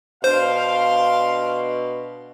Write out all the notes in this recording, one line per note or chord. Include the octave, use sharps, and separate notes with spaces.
B2 D4 C5 F5 C6